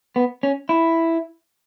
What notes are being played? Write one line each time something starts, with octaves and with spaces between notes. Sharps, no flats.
B3
C#4
E4